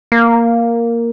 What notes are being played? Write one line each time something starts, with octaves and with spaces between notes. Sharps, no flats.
A#3